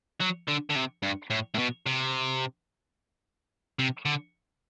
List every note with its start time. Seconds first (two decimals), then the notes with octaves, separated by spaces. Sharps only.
0.21 F#3
0.48 D3
0.70 D3
0.76 C3
1.03 G2
1.30 A2
1.54 A2
1.59 B2
1.86 C3
3.79 C3
4.06 D3